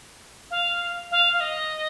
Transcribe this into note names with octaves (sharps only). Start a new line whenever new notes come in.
F5
F5
F5
D#5